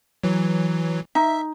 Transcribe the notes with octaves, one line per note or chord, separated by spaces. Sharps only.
E3 F#3
D#4 E5